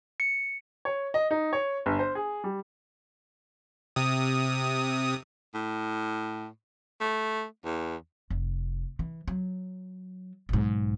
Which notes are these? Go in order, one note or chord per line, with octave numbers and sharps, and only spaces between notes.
C#7
C#5
D#5
D#4
C#5
G1
C5
G#4
G3
C3 D#6
A2
A3
E2
F1
E3
F#3
B1 G#2